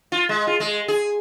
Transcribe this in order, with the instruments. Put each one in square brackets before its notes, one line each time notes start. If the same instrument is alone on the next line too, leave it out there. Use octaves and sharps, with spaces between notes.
[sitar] F4
G#3
F4
G#3
G#4